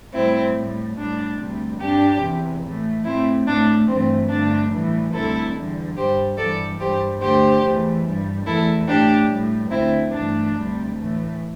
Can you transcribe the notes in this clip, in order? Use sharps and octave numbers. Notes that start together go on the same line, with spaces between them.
A2 G3 C4 E4
A2 G3
A2 G3 D4
D2 C3 G3
G2 G3 D4 G4
E2 C3 E3
A2 E3 A3
A2 A3 C4 E4
A2 A3 D4
G2 E3 A3 C4
G2 D3 A3 D4
A2 E3 G3
D2 C3 G3 E4 A4
E2 D3 G3
G2 G3 G4 C5
G2 E3 G3 A4 D5
G2 G3 G4 C5
D2 D3 A3 G4 C5
E2 E3 A3
G2 G3
E2 E3 A3 E4 A4
A2 A3 D4 G4
A2 G3
D2 D3 A3 C4 E4
G2 E3 A3 D4
D2 C3 G3
A2 E3 A3